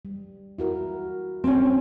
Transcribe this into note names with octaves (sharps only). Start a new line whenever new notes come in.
G3
E4 F#4 A#4
C4 C#4